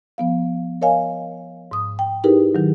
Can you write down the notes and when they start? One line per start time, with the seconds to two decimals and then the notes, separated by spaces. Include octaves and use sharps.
0.18 F3 B3 F5
0.82 A#4 C#5 D#5 F5 G#5
1.71 G#2 D#6
1.99 G5
2.24 D#4 E4 G4 G#4 A#4 B4
2.55 D#3 F#3